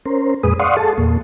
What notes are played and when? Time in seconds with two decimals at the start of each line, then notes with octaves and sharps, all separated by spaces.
0.06 C#4 A#4 C5
0.43 F2 A#2 G#3 G#4 B4 D#6
0.60 D5 F5 F#5 C6 C#6 D#6
0.77 G#4 A4 A5
0.98 E2 A#2 A#3